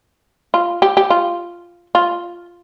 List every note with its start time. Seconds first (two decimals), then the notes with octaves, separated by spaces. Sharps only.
0.54 F4
0.82 G4
0.97 G4
1.10 F4
1.95 F4